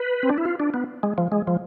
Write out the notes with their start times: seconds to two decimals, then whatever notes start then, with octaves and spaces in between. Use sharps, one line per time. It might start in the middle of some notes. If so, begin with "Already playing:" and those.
Already playing: B4
0.23 C4
0.30 D4
0.38 E4
0.45 F4
0.60 D4
0.74 B3
1.03 G#3
1.18 F3
1.32 G#3
1.47 F3